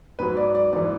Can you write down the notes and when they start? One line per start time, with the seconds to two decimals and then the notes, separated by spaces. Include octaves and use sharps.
0.19 G#2 F#3 B4
0.37 D5
0.55 D5
0.72 G#2 D5
0.76 E3